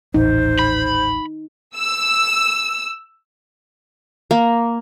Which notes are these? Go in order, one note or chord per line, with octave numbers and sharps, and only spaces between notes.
D#1 A1 D#4 C5
B5
E6
A#3